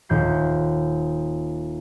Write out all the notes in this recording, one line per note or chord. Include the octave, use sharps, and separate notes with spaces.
D#1 G6 C7